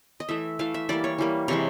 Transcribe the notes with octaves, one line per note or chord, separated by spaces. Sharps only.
D#5
E3 A3 E5
E3 A3 F5
E5
E3 G3 A#3 D5
C#5
E3 G3 A#3
C3 E3 G#3 C#5